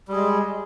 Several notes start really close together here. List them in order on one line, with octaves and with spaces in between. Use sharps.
G3 G#4 G#3